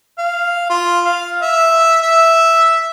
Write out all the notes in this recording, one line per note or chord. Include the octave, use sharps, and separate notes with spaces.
F5
F4
F5
E5
E5